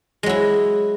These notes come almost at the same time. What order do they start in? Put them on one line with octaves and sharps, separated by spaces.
G#3 F#3 E4